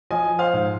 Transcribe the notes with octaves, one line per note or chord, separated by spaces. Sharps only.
F3 D#5 G#5
C5 F5
G#2